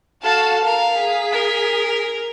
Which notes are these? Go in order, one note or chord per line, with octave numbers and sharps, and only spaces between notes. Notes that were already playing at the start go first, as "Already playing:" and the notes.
F#4 A4 F5 A5
A#4 F5
G#4 B6
A#4